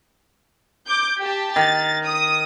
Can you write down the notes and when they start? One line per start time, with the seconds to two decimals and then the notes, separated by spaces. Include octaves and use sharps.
0.87 D6 G6
1.20 G4 A5
1.56 D#3 A6
2.05 D#6